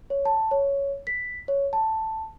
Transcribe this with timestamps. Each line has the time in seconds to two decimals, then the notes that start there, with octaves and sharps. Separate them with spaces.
0.10 C#5
0.25 A5
0.51 C#5
1.07 B6
1.48 C#5
1.73 A5